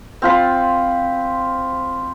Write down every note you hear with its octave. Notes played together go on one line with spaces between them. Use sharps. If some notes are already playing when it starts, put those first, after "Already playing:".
C4 F4 B5